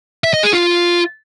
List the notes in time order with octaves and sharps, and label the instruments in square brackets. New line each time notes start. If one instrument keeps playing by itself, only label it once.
[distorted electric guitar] E5
D#5
G#4
F4